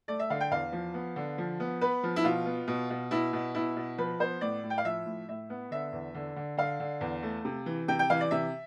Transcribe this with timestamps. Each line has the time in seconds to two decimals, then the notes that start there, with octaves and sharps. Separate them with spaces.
0.08 A3 D5
0.19 E5
0.30 D3 F5
0.41 G5
0.51 E2 F5
0.72 F3
0.94 B3
1.16 D3
1.38 F3
1.60 B3
1.81 B3 B4
2.03 F3
2.16 E4
2.24 B2 F4
2.46 B3
2.68 B2
2.90 B2
3.11 B2 E4
3.33 B2
3.55 B2 E4
3.76 B2
3.98 F3 B4
4.20 B3 C5
4.41 A2 D5
4.63 A2
4.70 G5
4.78 F5
4.85 F3 E5
5.06 A2
5.29 A2 E5
5.50 B3
5.71 D3 E5
5.92 E2
6.14 D3
6.36 D3
6.57 D3 F5
6.80 D3
7.01 E2
7.23 A3
7.45 C3
7.66 E3
7.88 C3 G5
7.99 G5
8.10 E3 F5
8.21 D5
8.31 C3 E5